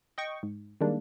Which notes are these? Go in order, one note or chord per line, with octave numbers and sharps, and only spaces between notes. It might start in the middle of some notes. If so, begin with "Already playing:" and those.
D#5 G5 C#6
G#2
D#3 G3 G#3 A#3 D4